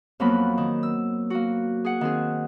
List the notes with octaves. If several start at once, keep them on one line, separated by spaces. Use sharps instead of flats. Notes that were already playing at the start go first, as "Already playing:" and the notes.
F2 F3 F#3 A#3 B3 B5
D#3
E6
A#3 F#4
G#4 F#5
D#3 C4 G#4